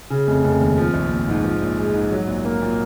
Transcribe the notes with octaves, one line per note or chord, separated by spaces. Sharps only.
C#3
F1
F1
D#2
F3
A#1
A#1
G#2
F3
A#1
G#3
G#2
F#3
A#1
A#3
A#2